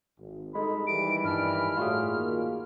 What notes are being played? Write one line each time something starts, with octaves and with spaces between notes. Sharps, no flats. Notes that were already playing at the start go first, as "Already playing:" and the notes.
G#1
G2 G#3 D#4 A4 B5
D#3 E3 G3 D7
G2 A5 F6
A2 F4 F#4 G#4
A#2 D#3 A#3